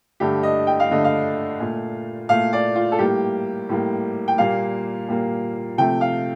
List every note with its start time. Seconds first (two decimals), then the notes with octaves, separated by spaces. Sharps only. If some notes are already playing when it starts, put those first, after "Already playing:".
0.20 G2 D3 A3 G4
0.43 D#5
0.67 G5
0.80 F5
0.90 G2 D3 A3 D#5
1.04 F5
1.60 A#2 A3
2.29 A#2 A3 F5
2.53 D5
2.76 F4
2.92 A4
2.99 A2 G3 A#3 G4
3.69 A2 G3 A#3
4.28 G5
4.38 A#2 G3 A#3 F5
5.09 A#2 G3 A#3
5.78 C3 F3 A3 G5
6.01 F5